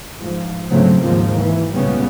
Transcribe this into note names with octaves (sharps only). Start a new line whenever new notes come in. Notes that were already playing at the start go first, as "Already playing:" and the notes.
G#2 F3
D2 G#2 C#3 F#3 A3 C4
D#2 G#2 F3 A#3
E3
C#2 A#2 C#3 G3 B3 C#4